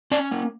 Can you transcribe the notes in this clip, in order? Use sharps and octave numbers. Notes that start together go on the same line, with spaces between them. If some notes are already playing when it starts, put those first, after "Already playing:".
C#4 D5
A#3